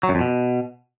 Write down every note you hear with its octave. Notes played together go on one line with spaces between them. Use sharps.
F#3
F#2
F2
B2